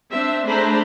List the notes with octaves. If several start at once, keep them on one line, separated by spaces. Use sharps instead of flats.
C4 D4 E5
A3 D4 G#4 C5 A#5 B5